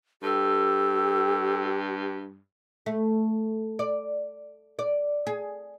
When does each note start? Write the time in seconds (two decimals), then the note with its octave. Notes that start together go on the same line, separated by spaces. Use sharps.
0.23 G2 G4 A4
2.86 A3
3.79 D5
4.79 D5
5.27 G#4